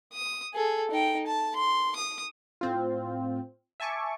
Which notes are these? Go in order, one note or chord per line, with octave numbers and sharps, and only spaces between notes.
D#6
G#4 A4
D#4 G5
A5
C6
D#6
A2 C4 F4
E5 G#5 A5 C#6 D6